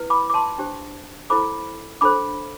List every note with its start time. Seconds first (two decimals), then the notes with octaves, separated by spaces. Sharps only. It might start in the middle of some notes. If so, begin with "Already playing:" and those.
Already playing: E4 B4
0.10 B5 D6
0.30 D6
0.34 A5 C6
0.58 D4 G4 C5
1.30 E4 A4 C5 B5 D6
2.01 D4 A4 C5 B5 D6